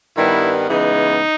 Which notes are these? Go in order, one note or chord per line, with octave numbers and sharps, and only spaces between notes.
G2 D#3 G3 B3 E4
C#3 E3 G#3 B3 D#4